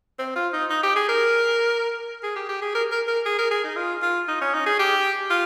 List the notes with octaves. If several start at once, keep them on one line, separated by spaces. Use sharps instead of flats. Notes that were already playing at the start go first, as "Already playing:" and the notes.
C4
F4
D#4
D#4
G4
G#4
A#4
G#4
G4
G4
G#4
A#4
A#4
A#4
G#4
A#4
G#4
D#4
F4
F4
D#4
C#4
D#4
G#4
G4
F4